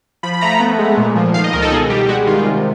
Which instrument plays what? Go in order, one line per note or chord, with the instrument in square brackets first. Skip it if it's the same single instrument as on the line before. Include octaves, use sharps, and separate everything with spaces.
[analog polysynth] F3 B5
B5
A3 A#5
B3
G#3
A#2
F3
D#3 F5
D#5
C#2 A#4
A4
B2 G#4
G3 G4
G#3 F#4
D#3 F4
C3